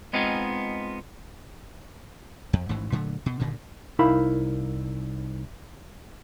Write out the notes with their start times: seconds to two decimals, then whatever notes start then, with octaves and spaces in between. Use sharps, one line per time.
0.13 G#3 B3 C4 D#4 F4 G#4
2.53 F2
2.69 A1 G#2 D#3 E3
2.92 A#2 D3 F#3 A3
3.26 B2
3.39 G2 A#2 D3 D#3
3.99 C2 D#4 E4 A#4 F5 B5